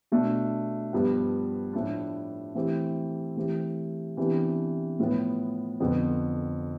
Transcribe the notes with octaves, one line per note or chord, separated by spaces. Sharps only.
B2 A3 D4
G2 F3 B3
A2 F3 A3 D4
E3 A3 C4 G4
E3 A3 C4 G4
C3 E3 B3 D4 G4
A2 F3 B3
F2 D3 F3 B3